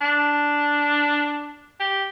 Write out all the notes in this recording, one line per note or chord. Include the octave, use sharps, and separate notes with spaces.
D4
G4